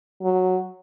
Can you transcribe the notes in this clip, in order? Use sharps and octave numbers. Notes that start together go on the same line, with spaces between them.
F#3